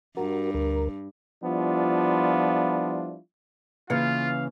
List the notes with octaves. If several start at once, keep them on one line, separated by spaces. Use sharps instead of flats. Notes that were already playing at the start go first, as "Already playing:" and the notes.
G2 F#4 A#4
D2 A#4
F3 G3 B3 D4 E4 F4
C#3 E3 A#3 F4 F5